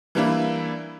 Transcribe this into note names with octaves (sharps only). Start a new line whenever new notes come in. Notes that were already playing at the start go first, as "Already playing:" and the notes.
E3 G3 A#3 D4 E4 B4